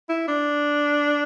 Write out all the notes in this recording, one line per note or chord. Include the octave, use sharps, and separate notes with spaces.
E4
D4